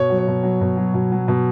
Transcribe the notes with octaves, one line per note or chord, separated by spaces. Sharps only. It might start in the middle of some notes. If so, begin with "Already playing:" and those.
Already playing: B2 C#5
F#3
C#5
B2
F#3
B2
F#3
B2
F#3
B2